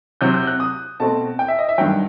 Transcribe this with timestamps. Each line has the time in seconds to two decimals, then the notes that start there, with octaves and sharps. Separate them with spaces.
0.21 C3 F#3 C4 G6
0.34 G6
0.47 F#6
0.60 D#6
1.00 B2 A3 C4 A5
1.39 G5
1.48 E5
1.59 D#5
1.69 E5
1.78 G2 D#3 F#3 G5